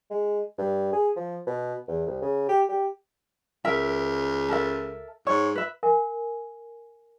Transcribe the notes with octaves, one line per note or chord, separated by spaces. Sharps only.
G#3
G2
G#4
F3
B2
E2
C2
C#3
G4
G4
C#2 A#4 E5
A4 A#4 E5
G#2 C#5
B4 E5
A#4 F#5 G#5